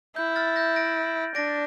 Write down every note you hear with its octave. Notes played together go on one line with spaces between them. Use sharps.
E4 G6
F6 A6
G6 A#6
A#6 D7
D4 A#6 D7